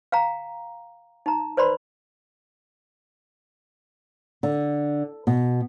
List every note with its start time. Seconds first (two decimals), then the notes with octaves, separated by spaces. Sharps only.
0.12 F5 G5 A#5
1.26 D#4 A#5
1.57 B4 C5 D5 B5 C6
4.43 D3
5.27 B2